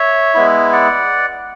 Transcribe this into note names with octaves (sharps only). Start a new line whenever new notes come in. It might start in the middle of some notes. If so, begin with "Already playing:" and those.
Already playing: C#5 E5
G#3 B3 E4
D5 F#5